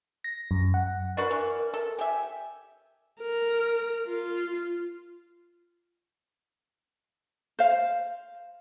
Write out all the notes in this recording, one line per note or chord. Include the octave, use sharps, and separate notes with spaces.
A#6
F#2
F#5
D4 F#4 A#4 B4
E3
A4
G4 E5 G#5
A#4
F4
C5 F5